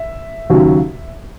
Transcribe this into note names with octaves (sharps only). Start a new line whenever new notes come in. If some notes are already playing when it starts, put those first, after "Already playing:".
Already playing: E5
D#2 C#3 F#3